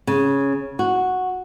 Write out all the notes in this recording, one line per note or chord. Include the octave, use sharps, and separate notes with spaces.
C#3
F#4